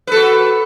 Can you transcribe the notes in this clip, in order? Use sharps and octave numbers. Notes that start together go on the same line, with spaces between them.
F#4 A4 B4